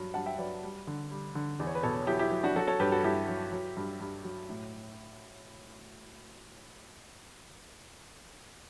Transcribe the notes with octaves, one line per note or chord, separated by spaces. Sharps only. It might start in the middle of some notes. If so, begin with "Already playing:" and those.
Already playing: G2 F#3
G2 F#5 A5
E5 G5
F#3 B4 D5
G3
D3
G3
D3
E2 D5
C#5
B4
B2 A4 C#5
F#3 E4 G4
E4 G4
F#3
D4 F#4
F#3 F#4 A4
A4 C#5
G2 G4 B4
F#4 A4
G2 E4 G4
F#3
F#3
G2
G2
F#3
A2